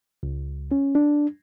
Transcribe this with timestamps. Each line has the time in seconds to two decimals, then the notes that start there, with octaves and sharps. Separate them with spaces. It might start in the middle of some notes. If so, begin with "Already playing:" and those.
0.23 C#2
0.72 C#4
0.95 D4